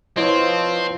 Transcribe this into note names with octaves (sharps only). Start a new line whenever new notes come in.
F3 C4 E4 B4 C#5 D#5 G#6 D7